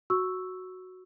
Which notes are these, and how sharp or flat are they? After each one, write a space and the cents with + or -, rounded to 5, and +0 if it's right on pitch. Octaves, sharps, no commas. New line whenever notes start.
F#4 +0 C#6 +0 E6 +0